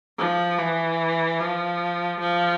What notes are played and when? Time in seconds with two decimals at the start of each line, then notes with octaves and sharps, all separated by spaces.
0.19 F3
0.58 E3
1.40 F3
2.20 F3